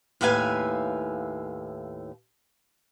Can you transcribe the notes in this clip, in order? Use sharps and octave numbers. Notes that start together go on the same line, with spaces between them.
D#2 A2 B4 E5 F5 G#5